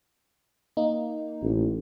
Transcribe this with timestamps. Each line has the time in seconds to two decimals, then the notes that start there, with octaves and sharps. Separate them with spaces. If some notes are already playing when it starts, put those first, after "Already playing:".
0.77 A#3 D#4
1.42 A1